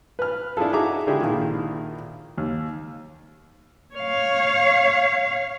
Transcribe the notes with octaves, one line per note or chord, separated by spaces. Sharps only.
B4 F6
D4 E4 F4 G#4 A4
D#4 F#4 G#4 E5 A#5 D6
D3 G#3 D4 E4 G4 G#4
A#1 D#3 E4 F4
D#2
C#5 F5